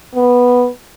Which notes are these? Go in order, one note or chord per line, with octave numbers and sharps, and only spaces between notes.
B3